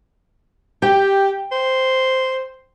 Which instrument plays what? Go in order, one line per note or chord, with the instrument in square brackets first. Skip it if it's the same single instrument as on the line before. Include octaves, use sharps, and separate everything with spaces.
[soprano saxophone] G4 [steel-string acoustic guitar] G5
[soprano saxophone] C5